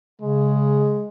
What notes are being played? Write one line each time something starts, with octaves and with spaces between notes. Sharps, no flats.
C#3 G#3